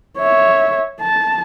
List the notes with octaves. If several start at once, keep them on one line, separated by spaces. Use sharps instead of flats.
C#5 E5
A5